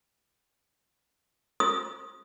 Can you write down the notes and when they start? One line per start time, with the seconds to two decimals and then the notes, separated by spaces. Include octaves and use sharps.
1.60 D#6